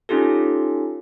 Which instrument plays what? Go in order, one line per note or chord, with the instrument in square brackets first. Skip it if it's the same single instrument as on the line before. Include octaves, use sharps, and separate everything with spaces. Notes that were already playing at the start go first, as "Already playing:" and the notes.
[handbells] C#4 D#4 F4 G4 A4